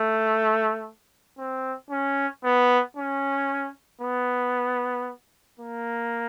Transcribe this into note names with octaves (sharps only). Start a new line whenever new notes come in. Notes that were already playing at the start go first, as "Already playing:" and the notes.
Already playing: A3
C4
C#4
B3
C#4
B3
A#3